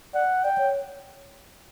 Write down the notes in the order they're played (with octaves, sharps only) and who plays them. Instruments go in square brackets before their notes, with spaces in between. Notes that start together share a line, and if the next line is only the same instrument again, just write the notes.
[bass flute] D5 [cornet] F#5
[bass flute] D5 [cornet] G5
[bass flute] C#5